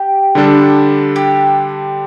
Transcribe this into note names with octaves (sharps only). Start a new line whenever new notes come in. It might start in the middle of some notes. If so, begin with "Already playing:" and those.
Already playing: G4
D3 G3 D4 A4
G4